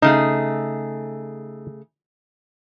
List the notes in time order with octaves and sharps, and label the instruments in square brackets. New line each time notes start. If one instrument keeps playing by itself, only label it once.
[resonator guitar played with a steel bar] C#3 A3 G#4 [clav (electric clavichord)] D#4